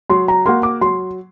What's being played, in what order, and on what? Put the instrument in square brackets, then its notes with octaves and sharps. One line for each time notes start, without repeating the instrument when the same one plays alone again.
[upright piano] F#3 [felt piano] C6
[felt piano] A#5
[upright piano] A#3 F#4 [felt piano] C6
[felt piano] D6
[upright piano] F#3 [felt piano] C6